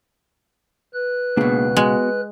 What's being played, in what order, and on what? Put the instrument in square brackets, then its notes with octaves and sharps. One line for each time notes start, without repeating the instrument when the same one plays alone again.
[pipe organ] B4 F#6
[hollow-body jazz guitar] C#2 B2 [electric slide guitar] A#3 D4 G#4
[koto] G#3 [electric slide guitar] B3 F#4